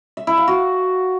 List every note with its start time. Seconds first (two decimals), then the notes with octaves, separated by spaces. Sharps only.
0.17 E5
0.27 E4
0.37 F5
0.48 F#4